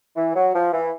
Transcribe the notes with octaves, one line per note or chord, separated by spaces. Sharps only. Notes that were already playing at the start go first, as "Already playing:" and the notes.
E3
F#3
F3
E3